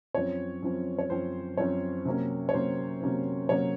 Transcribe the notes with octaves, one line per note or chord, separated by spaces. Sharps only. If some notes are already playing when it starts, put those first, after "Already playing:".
F#2 F3 C4 C#5
F#2 F3 C4
C#5
F#2 F3 C4 C5
F#2 F3 C4 C#5
C3 F#3 A#3 C#4
C#5
C3 F#3 A#3 C#4 C5
C3 F#3 A#3 C#4
C3 F#3 A#3 C#4 C#5